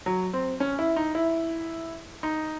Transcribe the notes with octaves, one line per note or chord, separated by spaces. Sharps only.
F#3
C4
C#4
E4
D#4
E4
D#4